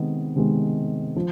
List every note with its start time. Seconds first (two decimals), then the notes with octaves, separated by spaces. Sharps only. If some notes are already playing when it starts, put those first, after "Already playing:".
Already playing: C3 D#3 G#3 B3
0.36 C3 D#3 G#3 B3
1.16 F3